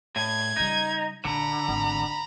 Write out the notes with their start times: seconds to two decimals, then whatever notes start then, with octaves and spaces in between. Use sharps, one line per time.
0.16 A2 G#6
0.57 C#3 G3 D#4
1.25 A#1 D3 A#5 B5
1.68 G#1 E2